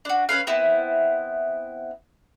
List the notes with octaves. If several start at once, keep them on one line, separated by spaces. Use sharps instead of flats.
D4 F#4
C#4 B4 F5
B3 C4 E4